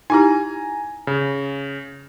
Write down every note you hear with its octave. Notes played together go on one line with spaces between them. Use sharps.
D#4 E4 G4 G#5 A#5
C#3